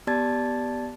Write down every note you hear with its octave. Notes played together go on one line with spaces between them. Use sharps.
B3 G4 D5 A5 G#6 A6